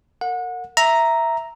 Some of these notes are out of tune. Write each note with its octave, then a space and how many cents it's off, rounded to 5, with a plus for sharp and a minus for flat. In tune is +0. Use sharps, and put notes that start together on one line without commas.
A#4 -30 F#5 -30
E5 +0 A#5 +0